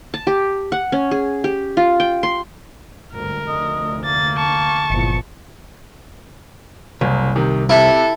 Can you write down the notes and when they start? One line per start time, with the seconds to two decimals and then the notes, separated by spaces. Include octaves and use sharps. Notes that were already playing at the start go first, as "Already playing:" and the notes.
0.14 A5
0.27 G4
0.72 F#5
0.92 C#4
1.11 G#4
1.44 G4
1.77 F4
2.00 G5
2.23 C6
3.13 G#1 D2 G2 A#4
3.48 F1 D2 D3 D#5
4.04 A#3 A6
4.38 A5 C#6
4.90 G1 E2 A#2 F3 C#7
7.01 F#1 C2
7.36 C3 D#3
7.69 C3 E4 A4